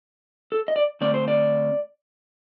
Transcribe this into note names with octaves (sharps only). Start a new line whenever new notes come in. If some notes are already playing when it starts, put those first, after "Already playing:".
A4
D#5
D5
D3 A3 C4 D5
C5
D5